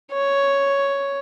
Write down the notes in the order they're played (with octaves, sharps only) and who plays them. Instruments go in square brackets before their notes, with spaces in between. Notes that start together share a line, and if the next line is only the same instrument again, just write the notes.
[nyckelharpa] C#5